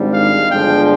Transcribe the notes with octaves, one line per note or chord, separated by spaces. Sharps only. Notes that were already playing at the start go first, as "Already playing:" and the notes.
Already playing: G#1 G#2 G3 D4
F5
G1 G2 F3 G#3 D4 G5